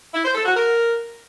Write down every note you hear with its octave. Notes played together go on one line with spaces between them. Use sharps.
E4
C5
A4
F#4
A#4